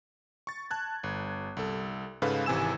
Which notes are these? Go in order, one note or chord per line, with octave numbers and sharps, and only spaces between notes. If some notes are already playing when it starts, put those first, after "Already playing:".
C#6 A6
A5 F#6 G#6
G1
C2 A4
G#2 C#3 A4 B4 F5 B5
G#1 C3 E3 G#5 E6 E7